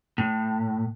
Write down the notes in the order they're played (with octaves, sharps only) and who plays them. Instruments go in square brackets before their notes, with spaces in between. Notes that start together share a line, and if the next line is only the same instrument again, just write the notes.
[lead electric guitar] A2